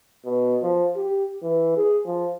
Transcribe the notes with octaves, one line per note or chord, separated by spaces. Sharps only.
B2
F3
G4
E3
G#4
F3